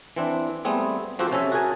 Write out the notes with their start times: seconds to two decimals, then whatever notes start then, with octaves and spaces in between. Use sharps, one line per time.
0.16 E3 C4 D4
0.65 G3 A3 B3 C4 G#4
1.19 F3 C4 F#4 G4 A4
1.31 C3 C#4 A4 E5 G#5
1.52 F#4 G#4 A#4 G#5 A5